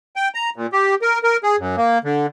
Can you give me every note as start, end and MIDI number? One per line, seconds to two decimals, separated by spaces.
0.16 0.28 79
0.35 0.50 82
0.56 0.67 46
0.73 0.95 67
1.02 1.19 70
1.24 1.37 70
1.43 1.56 68
1.59 1.76 42
1.77 1.98 58
2.04 2.26 50